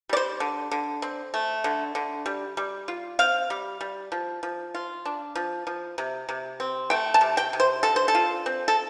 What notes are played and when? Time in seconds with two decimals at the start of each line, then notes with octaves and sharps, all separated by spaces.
0.09 G3 D5
0.17 C5
0.40 D3
0.71 D3
1.02 C4
1.34 A3
1.64 D3
1.95 D3
2.26 G3
2.57 G3
2.88 F4
3.19 C4 F5
3.50 G3
3.81 G3
4.12 F3
4.43 F3
4.75 F4
5.05 D4
5.35 F3
5.67 F3
5.98 C3
6.29 C3
6.60 C4
6.90 A3 G5
7.14 A5
7.21 C3
7.37 G5
7.53 C3
7.60 C5
7.83 D3 A4
7.96 C5
8.08 A4
8.15 F4
8.46 C4
8.68 A4